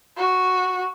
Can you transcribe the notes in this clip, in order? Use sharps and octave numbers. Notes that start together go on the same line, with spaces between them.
F#4